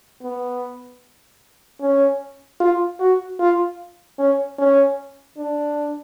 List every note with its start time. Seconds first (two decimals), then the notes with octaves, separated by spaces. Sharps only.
0.22 B3
1.81 C#4
2.61 F4
3.00 F#4
3.40 F4
4.19 C#4
4.59 C#4
5.37 D4